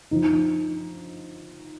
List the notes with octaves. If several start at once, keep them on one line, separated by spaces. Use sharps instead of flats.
F3 D#4